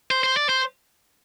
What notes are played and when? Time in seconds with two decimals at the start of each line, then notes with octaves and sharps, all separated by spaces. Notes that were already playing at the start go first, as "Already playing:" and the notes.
0.11 C5
0.23 C5
0.37 D5
0.49 C5